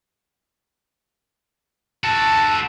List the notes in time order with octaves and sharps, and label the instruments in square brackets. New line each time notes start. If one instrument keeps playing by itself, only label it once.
[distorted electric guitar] F#4 A4 [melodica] A5